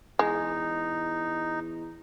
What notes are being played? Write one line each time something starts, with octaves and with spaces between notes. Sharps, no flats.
E2 G#3 D#4